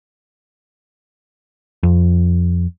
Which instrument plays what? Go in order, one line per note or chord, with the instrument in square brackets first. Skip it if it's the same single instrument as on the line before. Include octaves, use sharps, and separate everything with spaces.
[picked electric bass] F2